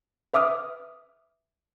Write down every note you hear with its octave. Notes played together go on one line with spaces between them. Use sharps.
B4 E5 D6 D#6 F6